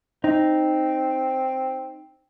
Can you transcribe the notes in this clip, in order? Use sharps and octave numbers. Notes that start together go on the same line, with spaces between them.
C4 D#4